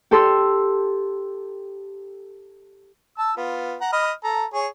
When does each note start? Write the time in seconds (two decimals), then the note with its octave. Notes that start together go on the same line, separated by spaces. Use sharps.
0.11 G4 A4 C6 E6
3.18 A5 E6
3.37 B3 F4
3.81 F#5 A#5
3.93 D#5 B5 F6
4.24 A4 A#5
4.54 G#4 C#5